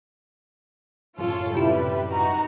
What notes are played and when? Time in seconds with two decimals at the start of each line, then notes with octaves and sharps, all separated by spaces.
1.18 F#2 A2 C#3 F4 A4 C#5
1.55 C3 G3 E4 B4
2.12 D#4 F#4 A#5